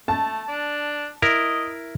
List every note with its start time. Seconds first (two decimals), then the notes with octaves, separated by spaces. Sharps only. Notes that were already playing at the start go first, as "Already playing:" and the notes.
0.08 A3 A5
0.48 D4
1.22 E4 A#4 D#5